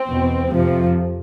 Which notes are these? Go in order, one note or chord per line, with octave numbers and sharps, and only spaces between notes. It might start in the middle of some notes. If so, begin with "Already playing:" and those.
Already playing: C4
E2 B2
F2 C3 F3